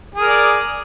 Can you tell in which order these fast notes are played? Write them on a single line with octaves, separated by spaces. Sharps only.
G#4 A#4 D5